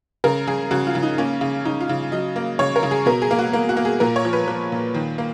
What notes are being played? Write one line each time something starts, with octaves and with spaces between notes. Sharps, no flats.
C#3 A#4
C#3 G#4
C#3 F#4
F4
C#3
D#4
A#3 C#4
C#3
C#3 D#4
F4
C#3
F#3 D#5
A#3
C#3 C#5
A#4
C#3
G#4
B2 A#4
G#4
A#3
F#4
A#3
F#4
A#3
G#4
A#2 A#4
C#5
F3
B4
F3
A#2
D#3
A#3